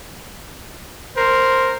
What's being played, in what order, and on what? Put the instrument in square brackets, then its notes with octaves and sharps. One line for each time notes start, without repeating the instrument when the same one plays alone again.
[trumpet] A#4 [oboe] C5